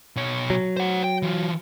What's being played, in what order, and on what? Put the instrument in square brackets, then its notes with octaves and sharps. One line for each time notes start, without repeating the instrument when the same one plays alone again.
[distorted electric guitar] B2 C#5
[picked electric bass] F#3
[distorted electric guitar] C5 F#5
G5
E3 F4